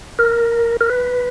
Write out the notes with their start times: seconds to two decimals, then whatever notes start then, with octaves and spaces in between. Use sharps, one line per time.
0.19 A#4
0.81 A#4
0.89 B4